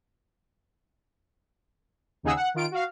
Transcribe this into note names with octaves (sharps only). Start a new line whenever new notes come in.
D#2 C#3 D#4 G#4 F#5 E6
F#5
D#3 F4 D7
F#4 F5